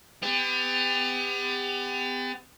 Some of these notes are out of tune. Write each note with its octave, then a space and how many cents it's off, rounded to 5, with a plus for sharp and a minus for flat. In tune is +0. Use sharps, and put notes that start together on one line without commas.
B3 +40 G4 +35